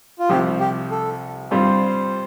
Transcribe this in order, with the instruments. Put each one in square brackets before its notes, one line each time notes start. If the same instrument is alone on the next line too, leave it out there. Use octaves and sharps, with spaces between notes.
[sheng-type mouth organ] F4
[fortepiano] C2 C3 F3 [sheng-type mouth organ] G4
[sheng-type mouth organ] G4
A4
[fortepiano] G2 G3 C4 F4 [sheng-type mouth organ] C5